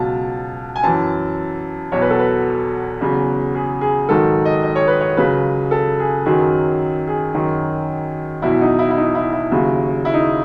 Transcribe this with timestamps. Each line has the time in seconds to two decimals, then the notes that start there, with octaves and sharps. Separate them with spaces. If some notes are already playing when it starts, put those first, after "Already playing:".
Already playing: C#2 B2 F#3 A5
0.76 G#5
0.83 F#2 E3 A5
1.92 E2 B2 F#3 C#5
2.02 B4
2.11 A4
2.19 B4
3.01 E2 C#3 F#3
3.55 G#4
3.81 G#4
4.09 G#2 D#3 F#3 A4
4.45 D#5
4.63 D#5
4.76 C#5
4.87 B4
5.00 C#5
5.17 C#2 C#3 F#3 B4
5.71 A4
5.99 G#4
6.26 F#2 D#3 F#3 G#4
7.08 G#4
7.34 F#2 D#3 F#3
8.42 E2 B2 F#3 E4
8.61 D#4
8.79 E4
8.91 E4
8.97 D#4
9.15 E4
9.33 E4
9.51 D#2 C#3 F#3
10.05 E4
10.14 D#4